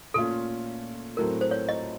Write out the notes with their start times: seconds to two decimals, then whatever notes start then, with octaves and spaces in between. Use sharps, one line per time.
0.14 A#2 A3 C#4 F4 A4
1.17 A2 F#3 A3 C4 A#4
1.41 C5
1.51 C#5
1.69 D#5